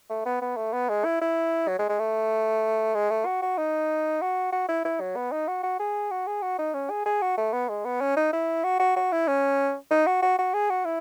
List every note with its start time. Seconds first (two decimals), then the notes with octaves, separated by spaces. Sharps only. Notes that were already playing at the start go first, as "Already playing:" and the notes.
0.10 A3
0.26 B3
0.42 B3
0.57 A3
0.73 B3
0.89 G#3
1.05 E4
1.21 E4
1.68 F#3
1.79 G#3
1.89 G#3
1.99 A3
2.95 G#3
3.10 A3
3.26 F#4
3.42 F#4
3.58 D#4
4.22 F#4
4.53 F#4
4.68 E4
4.85 E4
5.01 F#3
5.16 B3
5.32 D#4
5.48 F#4
5.63 F#4
5.79 G#4
6.11 F#4
6.27 G#4
6.42 F#4
6.59 D#4
6.74 C#4
6.90 G#4
7.06 G#4
7.22 F#4
7.38 A3
7.53 B3
7.69 G#3
7.85 B3
8.01 C#4
8.17 D#4
8.33 E4
8.64 F#4
8.80 F#4
8.96 F#4
9.12 E4
9.27 C#4
9.91 D#4
10.07 F#4
10.22 F#4
10.38 F#4
10.54 G#4
10.70 F#4
10.85 E4